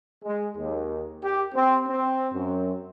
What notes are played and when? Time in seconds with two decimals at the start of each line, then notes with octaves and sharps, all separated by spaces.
0.25 G#3
0.58 D#2
1.24 G4
1.55 C4
1.88 C4
2.34 F#2